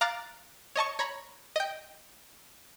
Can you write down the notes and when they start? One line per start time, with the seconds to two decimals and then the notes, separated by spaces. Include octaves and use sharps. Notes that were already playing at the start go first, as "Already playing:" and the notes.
0.01 F5 A#5 D6 F6 F#6 A6
0.76 C#5 D#5 A5 C#6
0.99 C#5 A#5 B5
1.56 D#5 G5